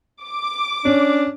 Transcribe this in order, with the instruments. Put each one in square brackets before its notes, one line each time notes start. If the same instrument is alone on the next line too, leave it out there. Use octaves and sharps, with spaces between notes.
[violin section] D6
[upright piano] C#4 [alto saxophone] D4